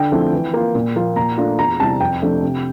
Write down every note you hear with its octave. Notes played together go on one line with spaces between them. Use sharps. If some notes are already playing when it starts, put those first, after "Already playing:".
Already playing: D3 G5
F3 A3 C4 E4
E3
A#3 F4
A#2
F3 A#3 F4
A#2 A#5
A3 D4 F4
E2 A#5
C3 G3 C4 E4 A5
F2 G5
C3 F3 A3 D4
C3